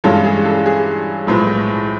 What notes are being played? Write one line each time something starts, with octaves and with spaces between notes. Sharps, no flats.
G2 E3 G#3 C#4 F4 A4
G#4
A4
G#4
B1 A2 F3 G#3 B3